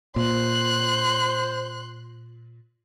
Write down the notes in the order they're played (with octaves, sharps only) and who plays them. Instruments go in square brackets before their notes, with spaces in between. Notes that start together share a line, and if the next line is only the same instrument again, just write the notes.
[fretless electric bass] A#2 [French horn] C5 [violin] C6 F#6